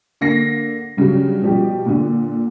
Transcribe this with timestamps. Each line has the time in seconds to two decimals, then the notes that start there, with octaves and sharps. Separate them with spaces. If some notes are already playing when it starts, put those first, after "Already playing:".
0.21 D3 A#3 A#6 C7
0.97 G2 C#3 F#3
1.42 B2 F3 G3 G4
1.86 A#2 D3